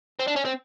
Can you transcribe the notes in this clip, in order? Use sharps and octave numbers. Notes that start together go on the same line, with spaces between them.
C4
D4
C#4
C4